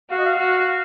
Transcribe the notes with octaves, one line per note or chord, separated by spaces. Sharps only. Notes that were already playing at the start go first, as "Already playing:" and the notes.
F#4 F5
D#5
F5
F#4